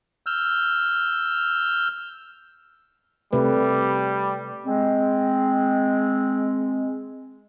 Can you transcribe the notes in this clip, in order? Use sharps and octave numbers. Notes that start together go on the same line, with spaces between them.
E6 F6 G6
C3 G3 A3 B4
G#3 C4